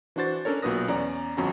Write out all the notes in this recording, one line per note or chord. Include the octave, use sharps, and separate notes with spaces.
E3 D4 F#4 C5 A6
C#4 D4 A4 A#4 C#5
B1 A#2 F#4 B4 D#6 A#6
E2 C#4 D5 A#5
G1 F2 C#4 F#4 A#5